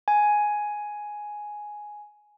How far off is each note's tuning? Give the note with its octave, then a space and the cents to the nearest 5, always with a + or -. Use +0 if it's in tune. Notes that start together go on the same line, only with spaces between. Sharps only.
G#5 +5